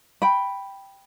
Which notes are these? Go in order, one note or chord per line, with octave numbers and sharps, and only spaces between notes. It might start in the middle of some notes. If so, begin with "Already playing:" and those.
G5 B5